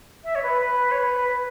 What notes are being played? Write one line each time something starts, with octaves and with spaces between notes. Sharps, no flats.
E5
C#5
B4
B4
C#5
B4
B4